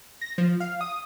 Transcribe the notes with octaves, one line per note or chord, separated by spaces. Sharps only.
A#6
F3
F5
D#6